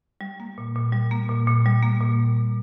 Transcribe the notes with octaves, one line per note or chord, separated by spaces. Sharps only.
G3
A#3
A#2
A#2
G3
A#3
A#2
A#2
G3
A#3
A#2